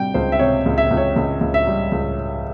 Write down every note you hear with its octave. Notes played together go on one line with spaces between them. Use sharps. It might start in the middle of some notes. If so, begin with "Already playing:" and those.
Already playing: C3 G3 G5
C#2 C5
E5
C3 C#5
C#2
E5
C#2
C#5
C#2
C#2
E5
G3
C#2